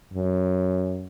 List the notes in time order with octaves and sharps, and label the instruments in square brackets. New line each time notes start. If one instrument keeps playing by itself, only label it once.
[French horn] F#2